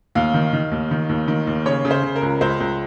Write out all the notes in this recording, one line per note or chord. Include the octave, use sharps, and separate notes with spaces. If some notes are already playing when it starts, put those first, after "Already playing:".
D#2 F5
D#3
D#3
D#2
D#3
D#2
D#3
D#2
C#3 C#5
C#3
C5
C#3
A#4
C#2
C#2 C5
C#2